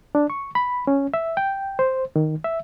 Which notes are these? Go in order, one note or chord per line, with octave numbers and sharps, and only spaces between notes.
D4
C#6
B5
C#4
E5
G5
C5
D#3
E5